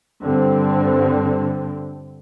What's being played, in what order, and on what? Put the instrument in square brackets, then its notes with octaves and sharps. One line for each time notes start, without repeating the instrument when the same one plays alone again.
[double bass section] G2 D3 C4